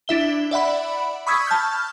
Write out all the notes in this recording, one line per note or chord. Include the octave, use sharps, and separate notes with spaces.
D4 E4 E5 G7
D5 E5 F#5 B5
B5 C#6 D#6 E6 G#6 B6
A5 F6 G6